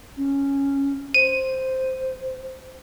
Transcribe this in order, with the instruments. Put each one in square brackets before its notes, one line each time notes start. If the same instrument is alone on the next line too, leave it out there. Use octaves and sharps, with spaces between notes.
[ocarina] C#4
[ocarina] C5 [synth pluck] D#7